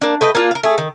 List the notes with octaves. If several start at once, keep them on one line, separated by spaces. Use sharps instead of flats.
A#3 D4
A3 B4 D#5 G5
A#3 D4 F4
A#4 F5
A3 G#4
D#3